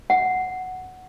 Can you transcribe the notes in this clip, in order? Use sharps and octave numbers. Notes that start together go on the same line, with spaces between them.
F#5